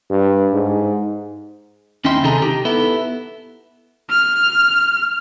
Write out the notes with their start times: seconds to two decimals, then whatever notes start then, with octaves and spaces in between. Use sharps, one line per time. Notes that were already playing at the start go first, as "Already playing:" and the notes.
0.10 G2
0.54 G#2
2.05 D#2 C#4 D#4 E4 G5 C6
2.23 C3 D#3 D#4 G#4 A4 A#5
2.42 D#4 G4
2.65 B3 E4 A4
4.10 F6